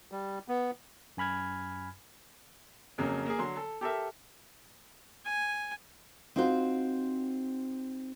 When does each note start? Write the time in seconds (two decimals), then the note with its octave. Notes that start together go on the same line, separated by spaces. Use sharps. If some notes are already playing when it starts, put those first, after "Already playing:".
0.12 G3
0.48 B3
1.17 F#2 G#5 B5 F6 G#6
2.98 F2 C#3 F#3 A#3
3.26 A#3 G#4
3.38 D3 F#3 C6
3.57 A4
3.81 G4 A4 A#4 E5
5.25 G#5
6.36 C4 D#4 F4 F#4 C5